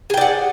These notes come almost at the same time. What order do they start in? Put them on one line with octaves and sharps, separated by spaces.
G#4 G5 D5 F#5